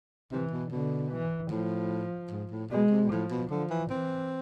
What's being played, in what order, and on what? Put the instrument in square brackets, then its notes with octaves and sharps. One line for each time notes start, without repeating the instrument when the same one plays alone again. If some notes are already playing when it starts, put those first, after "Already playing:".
[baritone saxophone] C3 [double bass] E3
[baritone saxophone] B2
[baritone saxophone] B2 [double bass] D3
[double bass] E3
[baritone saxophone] A2 [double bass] F3
[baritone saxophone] G#2
A2
[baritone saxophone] B2 [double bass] G#3
[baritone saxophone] C3
B2
[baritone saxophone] A2 [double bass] F3
[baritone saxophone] B2
[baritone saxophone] D3 [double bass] F3
[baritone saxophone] E3
[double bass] E3 [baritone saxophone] C4